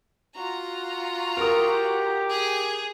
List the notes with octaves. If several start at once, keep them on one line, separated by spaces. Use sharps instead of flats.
F4 F#4 A#5
G4 A#4 D#6
G#4